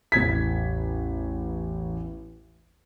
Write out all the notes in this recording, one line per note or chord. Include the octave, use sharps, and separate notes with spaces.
A1 E2 G#6 B6